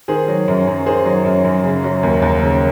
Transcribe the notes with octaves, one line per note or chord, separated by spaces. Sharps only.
D#3 G#4 C5
F#3
F#2
F#2
D#3 G#4 C5
F#3
F#2
F#2
C#3
F#3
D#2
D#2
C#3